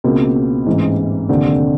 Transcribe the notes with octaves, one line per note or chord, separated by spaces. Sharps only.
C#2 B2 A#3 C4
A1 G#2 E3
F1 D#2 D3 C4 D4